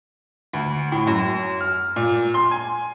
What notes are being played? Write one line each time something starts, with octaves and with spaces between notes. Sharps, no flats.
D2
A2
F#2
F6
A#2
C6
G#5